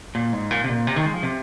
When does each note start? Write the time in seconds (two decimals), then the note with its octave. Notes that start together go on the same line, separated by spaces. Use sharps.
0.15 A#2
0.33 G#2
0.51 A#2
0.64 C3
0.69 A#2
0.87 C3
0.96 D#3
1.06 G#3
1.14 F3
1.23 C3